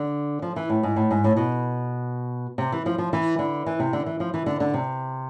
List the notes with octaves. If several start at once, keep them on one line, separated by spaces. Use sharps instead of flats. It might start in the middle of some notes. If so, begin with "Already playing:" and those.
Already playing: D3
F3
E3
A2
G#2
A2
G#2
A2
B2
C3
E3
F3
F3
E3
D3
E3
C3
D3
E3
F3
E3
D3
D3
C3